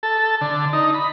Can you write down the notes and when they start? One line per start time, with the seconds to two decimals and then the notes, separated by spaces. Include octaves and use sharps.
0.03 A4
0.41 D3
0.73 D#4
0.94 B5